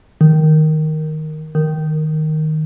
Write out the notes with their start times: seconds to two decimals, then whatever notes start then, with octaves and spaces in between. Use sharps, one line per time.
0.21 D#3
1.55 D#3